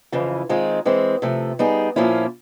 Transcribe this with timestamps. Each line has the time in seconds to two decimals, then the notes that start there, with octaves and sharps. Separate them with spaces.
0.12 F2 C#3 E3
0.49 D#3 G#3 C4 F4
0.85 E3 G#3 C4
1.22 C3 F3 A3
1.59 G3 B3 D#4 G#4
1.96 A#2 F3 A#3 C#4 E4